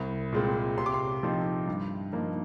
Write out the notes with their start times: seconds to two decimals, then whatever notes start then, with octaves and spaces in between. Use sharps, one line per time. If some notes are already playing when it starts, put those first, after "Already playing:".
Already playing: C2
0.32 A#2 G#3 C4
0.77 C3 C6
0.86 D6
0.94 C6
1.23 F3 C4 D#4
1.67 G2
2.13 F3 A#3 D#4